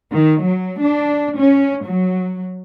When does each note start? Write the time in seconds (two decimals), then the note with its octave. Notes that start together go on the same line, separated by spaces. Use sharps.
0.12 D#3
0.43 F#3
0.80 D4
1.38 C#4
1.84 F#3